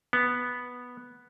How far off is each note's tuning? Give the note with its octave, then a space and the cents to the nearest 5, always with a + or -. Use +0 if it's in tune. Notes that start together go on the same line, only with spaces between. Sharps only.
B3 -5